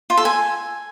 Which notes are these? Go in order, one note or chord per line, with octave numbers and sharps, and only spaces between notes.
F4
A4
G#5